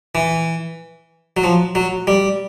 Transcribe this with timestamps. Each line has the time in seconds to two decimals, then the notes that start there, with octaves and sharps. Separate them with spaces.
0.15 E3
1.37 F#3
1.44 F3
1.75 F#3
2.07 G3